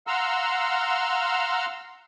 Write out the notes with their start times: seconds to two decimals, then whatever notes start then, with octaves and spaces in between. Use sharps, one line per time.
0.07 F5 F#5 A#5 C6 E6 F6